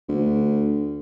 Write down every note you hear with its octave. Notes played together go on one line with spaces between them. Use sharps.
D2